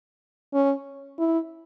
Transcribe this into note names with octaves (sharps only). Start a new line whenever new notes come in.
C#4
E4